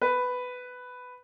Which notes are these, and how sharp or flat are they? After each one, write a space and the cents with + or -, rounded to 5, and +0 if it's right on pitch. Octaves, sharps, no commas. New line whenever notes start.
B4 +10